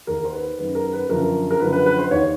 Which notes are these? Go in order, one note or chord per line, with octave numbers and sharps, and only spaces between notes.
D#2 D#3 A#4
C5
B4
F#2 D#3 B4
A#4
B4
F#2 D3 F3 A#4
A#4
F#2 D3 F3 B4
B4
B4
C5
D#2 D#3 C#5